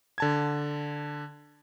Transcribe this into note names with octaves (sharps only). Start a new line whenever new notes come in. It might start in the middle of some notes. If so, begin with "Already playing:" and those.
D3 A5 G#6